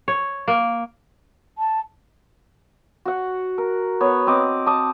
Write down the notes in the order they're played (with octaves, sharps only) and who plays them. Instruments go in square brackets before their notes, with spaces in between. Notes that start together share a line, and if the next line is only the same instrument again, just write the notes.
[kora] C#5
A#3
[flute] A5
[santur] F#4 F#5
A#4
B3 C#5
C4 D#5 D6
A5 D6 D#6